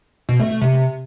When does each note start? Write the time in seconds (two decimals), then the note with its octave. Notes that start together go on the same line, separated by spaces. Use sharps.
0.29 B2
0.40 A3
0.50 A3
0.61 C3